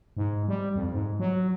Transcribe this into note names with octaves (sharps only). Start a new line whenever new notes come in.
G#2
G3
F2
G#2
F#3